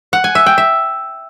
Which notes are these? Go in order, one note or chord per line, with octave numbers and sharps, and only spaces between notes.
F#5
G#5
E5
G5
E5